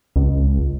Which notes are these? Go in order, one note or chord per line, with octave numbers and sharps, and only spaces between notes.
C#2